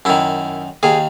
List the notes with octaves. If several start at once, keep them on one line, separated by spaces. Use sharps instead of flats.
F#2 D#3 E4
D#2 D#3 G#4